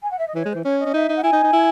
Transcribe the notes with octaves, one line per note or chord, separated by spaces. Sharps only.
G#5
F#5
E5
D#5
E3 C#5
G#3
E3 C5
C#4 C#5
D#5
C#4
D#4 E5
D#4
F#5
E4 G#5
D#4
D#4
E4